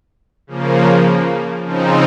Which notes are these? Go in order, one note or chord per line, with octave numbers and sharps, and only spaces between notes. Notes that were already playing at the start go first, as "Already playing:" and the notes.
C#3 F3 A#3
C#3 F3 C4 D#4